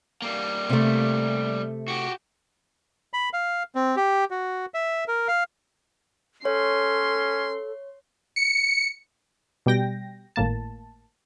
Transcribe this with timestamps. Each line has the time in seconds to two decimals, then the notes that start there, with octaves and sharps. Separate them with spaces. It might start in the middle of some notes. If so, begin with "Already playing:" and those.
0.22 G3 A#3
0.70 C3 A3
1.88 F#4 G4
3.14 B5
3.33 F5
3.75 C4
3.96 G4
4.31 F#4
4.74 E5
5.08 A#4
5.28 F5
6.45 C#4 A4 C#5 C6
8.36 C#7
9.66 B2 G3 G5 A#6
10.36 G#1 A2 A#3 A5